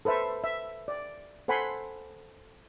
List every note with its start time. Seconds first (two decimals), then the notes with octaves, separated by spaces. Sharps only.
0.05 A4 B4 C5 E5
0.44 E5
0.88 D5
1.48 A4 C5 F#5 G#5 B5 C6